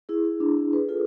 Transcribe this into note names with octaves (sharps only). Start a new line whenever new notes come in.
E4 G#4
E4
D4
D4
G#4 B4
F4 A4